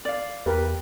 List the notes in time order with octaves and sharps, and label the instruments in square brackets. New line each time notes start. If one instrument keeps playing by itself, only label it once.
[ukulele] D5 F5
[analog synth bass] E2 [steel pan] G4 A#4 B4